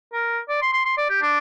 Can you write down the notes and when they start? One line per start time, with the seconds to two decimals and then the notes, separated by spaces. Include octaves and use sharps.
0.13 A#4
0.49 D5
0.61 C6
0.73 C6
0.85 C6
0.97 D5
1.09 G4
1.22 D4